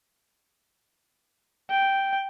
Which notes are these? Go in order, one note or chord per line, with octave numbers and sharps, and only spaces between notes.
G5